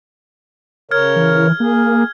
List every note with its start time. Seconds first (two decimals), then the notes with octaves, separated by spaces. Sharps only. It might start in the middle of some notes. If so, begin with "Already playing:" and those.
0.91 C#3 A#4 C#5 F6 G#6
1.16 E3
1.60 A#3 G#4